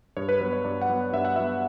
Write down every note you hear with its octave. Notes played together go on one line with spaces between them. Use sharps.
G2 C#5
B4
F#3 B3 B4
C#5
G2 D5
F#5
F#3 B3
G2 E5
F#5
F#3 B3 E5